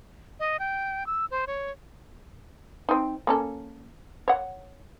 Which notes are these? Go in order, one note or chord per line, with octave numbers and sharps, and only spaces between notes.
D#5
G5
E6
C5
C#5
C4 D#4
A#3 C#4 A4
C#5 F#5